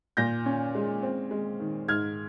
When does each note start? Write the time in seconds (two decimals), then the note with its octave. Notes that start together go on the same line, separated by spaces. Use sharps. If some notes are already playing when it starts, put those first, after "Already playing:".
0.17 A#2 G6 A#6
0.46 C#4
0.75 G#3
1.03 C4
1.31 G#3
1.60 D#3
1.88 G#2 F6 G#6